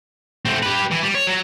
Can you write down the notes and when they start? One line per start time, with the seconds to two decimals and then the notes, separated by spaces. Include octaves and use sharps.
0.45 A3 C4
0.63 G4 B4
0.91 E3
1.03 G3
1.15 C#5
1.27 F#3